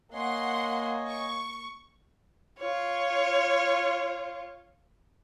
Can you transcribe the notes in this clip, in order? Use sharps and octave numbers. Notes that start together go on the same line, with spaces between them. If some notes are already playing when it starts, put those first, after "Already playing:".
A#3 C#5 D#5 F#5 G#5 C6
C#6
F4 C#5